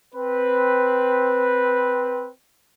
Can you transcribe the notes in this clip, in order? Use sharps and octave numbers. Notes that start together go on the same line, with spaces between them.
C4 B4